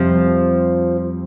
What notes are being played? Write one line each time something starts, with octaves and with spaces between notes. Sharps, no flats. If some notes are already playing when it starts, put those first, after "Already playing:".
Already playing: F2 C3 F3 G3 C4